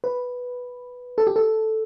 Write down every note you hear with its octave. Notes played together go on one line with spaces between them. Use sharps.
B4
A4
G4
A4